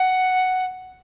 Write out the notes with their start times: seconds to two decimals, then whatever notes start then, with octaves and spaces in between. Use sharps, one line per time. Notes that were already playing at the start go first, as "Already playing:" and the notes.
Already playing: F#5